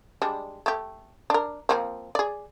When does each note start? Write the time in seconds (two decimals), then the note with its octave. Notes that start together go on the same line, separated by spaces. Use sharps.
0.22 G3 G#3 D4
0.66 A3 G4
1.30 D4 A#4
1.69 F3 A#3 C4
2.15 G#4 D5